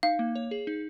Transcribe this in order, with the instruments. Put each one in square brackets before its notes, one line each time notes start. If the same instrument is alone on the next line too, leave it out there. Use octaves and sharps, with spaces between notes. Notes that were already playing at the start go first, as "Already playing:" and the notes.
[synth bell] D#4 [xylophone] F5
[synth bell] A#3
C#5
G#4
D#4